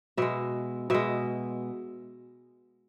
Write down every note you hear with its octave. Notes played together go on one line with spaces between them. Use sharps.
B2 G#3 E5
B2 G#3 E5